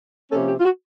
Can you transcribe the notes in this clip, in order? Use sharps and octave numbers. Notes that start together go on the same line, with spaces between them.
C3 F3 A#3 C#4 A4
G4
F4
F#4